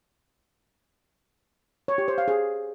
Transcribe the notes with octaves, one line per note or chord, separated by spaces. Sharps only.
C#5
G4
C5
F5
G#4